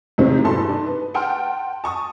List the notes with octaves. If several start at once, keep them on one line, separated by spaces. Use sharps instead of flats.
E2 A2 C3 D#3 C4
G2 B2 E3 A4 A5 C6
D4 D#4
B4
F#5 G5 A5 C6 F6
A5 C#6 D#6